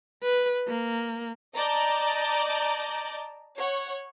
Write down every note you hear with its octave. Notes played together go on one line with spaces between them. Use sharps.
B4
A#3
D5 D#5 A5 A#5 D6 G6
C#5 F#5